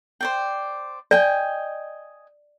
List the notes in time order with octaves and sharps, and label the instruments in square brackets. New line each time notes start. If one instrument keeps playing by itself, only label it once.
[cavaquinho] C5 D5 G5
[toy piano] D5 [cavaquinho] D#5 G5 G#5